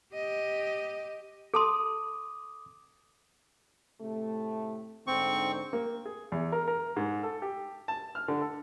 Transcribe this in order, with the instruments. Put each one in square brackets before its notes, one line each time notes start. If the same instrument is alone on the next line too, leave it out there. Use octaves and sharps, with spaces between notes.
[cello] G4 D#5
[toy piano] A4 A5 C6 [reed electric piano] D6 D#6
[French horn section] A2 C3 A3
[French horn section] G#2 D3 [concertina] C4 C#6
[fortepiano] A#3
G#4
E2
A#4
A#4
G#2
A4
G4
A5
F6
D3
A4